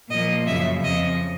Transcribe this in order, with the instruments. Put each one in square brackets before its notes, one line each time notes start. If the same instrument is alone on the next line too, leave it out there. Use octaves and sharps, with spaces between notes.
[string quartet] A#2 F3 A#3 D#5
F#2 C#3 F3 E5
F2 C#3 F3 D#5